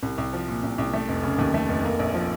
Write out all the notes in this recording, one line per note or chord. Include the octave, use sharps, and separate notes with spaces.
C2
C2
F3
A#2
C2
C2
A3
F1
C#3
D#2
A3
F1
A#3
A#1
F3